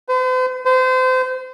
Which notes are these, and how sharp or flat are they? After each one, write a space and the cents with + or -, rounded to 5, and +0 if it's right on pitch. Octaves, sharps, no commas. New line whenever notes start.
C5 -45
C5 -30